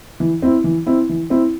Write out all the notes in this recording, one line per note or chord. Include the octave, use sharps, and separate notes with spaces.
E3
C4 E4
E3
C4 E4
E3
C4 E4